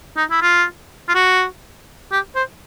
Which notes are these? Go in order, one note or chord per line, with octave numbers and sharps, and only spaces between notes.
D#4
E4
F4
F4
F#4
G4
C5